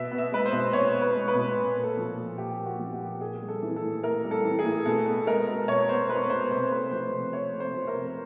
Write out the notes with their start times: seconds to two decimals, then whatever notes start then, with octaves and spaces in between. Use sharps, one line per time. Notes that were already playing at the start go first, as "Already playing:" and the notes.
Already playing: B2 E5
0.11 B3
0.18 E5
0.32 G#3 B4
0.46 C5
0.53 B2
0.73 B2 C#5
0.94 B3
1.01 B4
1.15 G#3
1.28 B4
1.35 B2
1.56 A#2
1.77 A#3
1.84 A4
1.97 F3
2.17 A#2
2.38 A#2 G4
2.59 A#3
2.66 F#4
2.79 F3
2.93 G4
3.00 A#2
3.20 A#3 G#4
3.41 G3
3.48 A4
3.62 E3
3.76 A4
3.82 A2
4.03 A#3 A#4
4.24 G3
4.31 A4
4.44 E3
4.59 G#4
4.65 A2
4.86 B2 A4
5.06 B3 A4
5.27 G#3 A#4
5.47 B2
5.68 B2 C#5
5.89 B3 C5
6.09 G#3 B4
6.30 B2 C5
6.51 C3 C5
6.71 A3 B4
6.91 F3 C5
7.12 C3
7.33 C3 C#5
7.53 A3
7.60 C5
7.74 F3
7.87 A#4
7.95 C3